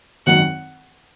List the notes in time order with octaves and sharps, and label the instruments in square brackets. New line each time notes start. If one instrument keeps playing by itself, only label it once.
[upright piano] G#1 F#2 D#3 F#3 [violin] F#5